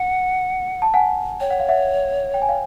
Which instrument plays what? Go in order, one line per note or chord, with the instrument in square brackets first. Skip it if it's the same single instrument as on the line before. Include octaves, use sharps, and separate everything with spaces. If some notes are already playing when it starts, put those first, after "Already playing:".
Already playing: [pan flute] F#5
[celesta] A5
F#5 G#5
[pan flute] C#5 [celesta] G5
[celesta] F#5
F5
E5 F#5
G5
G#5
F5 G5